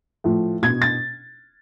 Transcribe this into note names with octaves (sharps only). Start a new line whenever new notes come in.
A2 F3
B2 G#6
A6